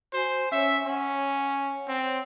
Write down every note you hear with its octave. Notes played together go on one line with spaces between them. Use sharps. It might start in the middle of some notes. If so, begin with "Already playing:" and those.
F#4 C5 G#5
C#4 C#5 E5 G#5
C#4 C#5 F#5
C4